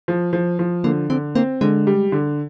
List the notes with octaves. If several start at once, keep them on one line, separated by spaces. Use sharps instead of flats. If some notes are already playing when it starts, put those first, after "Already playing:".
F3
F3
F3
D3 A#3
D3 C4
A#3 C4
D3 G#3
G3
D3